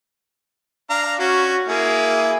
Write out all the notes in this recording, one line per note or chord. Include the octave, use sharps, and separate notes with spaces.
D4 F5 A#5
C#4 F#4
A#3 E4 G#4